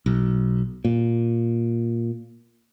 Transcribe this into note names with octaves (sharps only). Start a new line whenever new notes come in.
B1
A#2